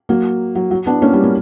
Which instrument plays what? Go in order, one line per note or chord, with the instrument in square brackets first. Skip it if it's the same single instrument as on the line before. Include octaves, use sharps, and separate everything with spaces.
[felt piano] F#3 A#3
F#3
F#3
B3 D4
A#3 C#4
G3
A#3